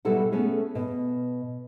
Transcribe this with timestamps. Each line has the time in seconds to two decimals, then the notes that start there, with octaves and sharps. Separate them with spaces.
0.05 B2 F#3 G3 E4 A4 F#5
0.32 A3 B3 C#4 G#4
0.75 B2